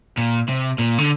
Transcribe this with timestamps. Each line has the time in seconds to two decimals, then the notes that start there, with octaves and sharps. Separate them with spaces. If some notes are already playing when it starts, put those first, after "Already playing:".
0.17 A#2
0.48 C3
0.78 A#2
0.98 D3